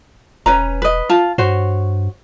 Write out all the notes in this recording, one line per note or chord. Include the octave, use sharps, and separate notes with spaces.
E1 C#4 B4 A#5
B4 D#5
F4 A5
G2 F#4 C5 C#5